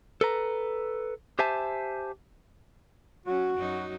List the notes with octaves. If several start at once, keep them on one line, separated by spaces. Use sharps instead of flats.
A4 B4 A#5
G4 C5 E5 G#5 A5
F#3 C#4 F#4
F#2 F#3 D#4